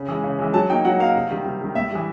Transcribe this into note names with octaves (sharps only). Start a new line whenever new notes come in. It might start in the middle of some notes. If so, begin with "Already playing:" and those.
Already playing: C#3
E3 G#3
C#3
E3 G#3
F#3 A5
A#3 D#4 G5
F#3 F#5
A#3 D#4 F5
C3
D#3 G3
C3
D#3 G3
A2 E5
E3 G3